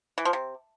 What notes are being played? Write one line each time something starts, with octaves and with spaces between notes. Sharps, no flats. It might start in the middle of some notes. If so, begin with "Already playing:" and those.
E3
F3
C3